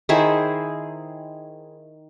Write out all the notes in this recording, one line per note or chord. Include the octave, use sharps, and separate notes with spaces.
D#3 E4 G#4 C5